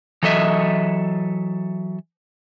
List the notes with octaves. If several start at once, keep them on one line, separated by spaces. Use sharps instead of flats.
E3 F#3 A4 D#5 E5